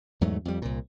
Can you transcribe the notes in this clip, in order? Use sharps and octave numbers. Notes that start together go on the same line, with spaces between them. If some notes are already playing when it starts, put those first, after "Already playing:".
E2 G#2 F#3 A3
F2 G3
C2 A#2